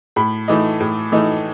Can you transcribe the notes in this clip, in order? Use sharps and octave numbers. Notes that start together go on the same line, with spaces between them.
A2 B5
E3 A3 D#4
A2
E3 A3 D#4